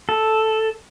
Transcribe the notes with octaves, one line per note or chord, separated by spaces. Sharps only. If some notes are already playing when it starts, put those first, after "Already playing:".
A4